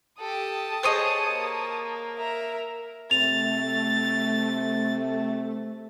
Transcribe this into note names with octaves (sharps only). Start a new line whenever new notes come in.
G4 A4 A5 D#6
G#4 C5 C#5 D#5
A#3
A#4 E5 A#5
C3 A3 A6 F7